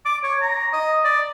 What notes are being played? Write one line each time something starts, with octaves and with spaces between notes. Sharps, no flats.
D6
C#5
A#5
D#5
D5